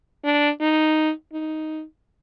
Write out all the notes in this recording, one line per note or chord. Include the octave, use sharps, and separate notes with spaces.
D4
D#4
D#4